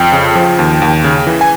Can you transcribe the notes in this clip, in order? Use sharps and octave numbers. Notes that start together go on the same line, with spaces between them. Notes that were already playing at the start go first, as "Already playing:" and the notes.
Already playing: F2 G5
C#3
F3
D#2
D#2
C#3
E3
G#5